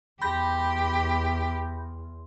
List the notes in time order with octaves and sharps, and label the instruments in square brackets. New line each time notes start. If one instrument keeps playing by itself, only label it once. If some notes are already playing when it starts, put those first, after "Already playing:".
[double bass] E2 [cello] G4 [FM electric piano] B5 G6 A#6 [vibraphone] C6